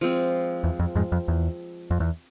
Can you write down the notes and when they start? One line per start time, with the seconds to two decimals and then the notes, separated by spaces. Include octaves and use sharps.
0.01 F3 G#3 C4
0.64 E2
0.79 F2
0.95 F2 G#2
1.12 F2
1.28 E2
1.91 F2
2.00 E2